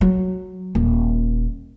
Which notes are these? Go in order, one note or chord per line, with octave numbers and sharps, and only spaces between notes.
F#3
D#1